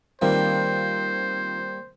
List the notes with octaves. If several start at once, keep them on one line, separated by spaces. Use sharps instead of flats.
D#3 G3 A#3 C4 F4 C5